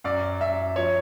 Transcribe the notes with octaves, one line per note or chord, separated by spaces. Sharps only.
F#2 D5
F#2 E5
F3 C#5